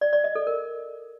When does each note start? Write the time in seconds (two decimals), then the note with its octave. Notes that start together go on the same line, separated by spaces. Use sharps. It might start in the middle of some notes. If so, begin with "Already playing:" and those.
0.01 D5
0.13 D5
0.24 D#5
0.35 A4
0.47 A#4